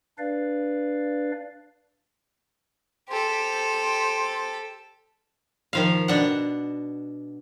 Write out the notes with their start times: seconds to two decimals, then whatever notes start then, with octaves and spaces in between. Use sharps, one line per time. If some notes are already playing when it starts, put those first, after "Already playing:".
0.18 D4 B4 D5 F5
3.09 G4 A4 C5
5.73 D#3 F3 F5
6.08 B2 D4 F#5